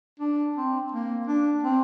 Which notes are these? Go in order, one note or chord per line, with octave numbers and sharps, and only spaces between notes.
D4
C4
A#3
D4
C4